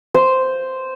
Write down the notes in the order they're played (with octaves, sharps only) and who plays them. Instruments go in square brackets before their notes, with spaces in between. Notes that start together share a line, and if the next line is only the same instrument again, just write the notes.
[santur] C5